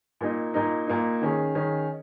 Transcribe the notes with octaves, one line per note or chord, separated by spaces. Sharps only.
A#2 A#3 D#4
A#2 A#3 D#4
A#2 A#3 D#4
D#3 C#4 G#4
D#3 C#4 G#4